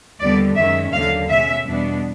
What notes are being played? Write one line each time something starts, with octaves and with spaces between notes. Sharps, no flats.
D#2 D3 G3 B3 D5
F#2 D#3 G#3 C#4 E5
D#2 D3 F#3 F5
B2 G#3 C#4 E5
E2 B2 G3 B3 D4